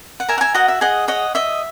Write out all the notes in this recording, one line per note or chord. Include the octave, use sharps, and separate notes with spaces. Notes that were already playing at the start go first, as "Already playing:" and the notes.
F#5
A#4 E5 G#5
F#5
E5 G#5
F#4 D#5 F#5
E5
G#4 D#5 F#5
C#5 D#5 F#5
D#5 E5